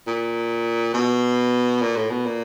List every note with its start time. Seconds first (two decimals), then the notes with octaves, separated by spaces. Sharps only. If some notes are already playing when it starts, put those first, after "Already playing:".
0.07 A#2
0.94 B2
1.82 A#2
1.96 A2
2.10 B2
2.26 A#2